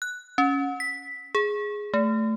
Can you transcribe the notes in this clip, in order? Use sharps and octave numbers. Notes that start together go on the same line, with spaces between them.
F#6
C#4
B6
G#4
A3